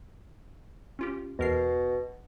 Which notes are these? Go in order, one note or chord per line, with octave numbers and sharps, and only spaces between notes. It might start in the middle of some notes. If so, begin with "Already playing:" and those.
C#4 F4 G4
E2 B2 A#4 C7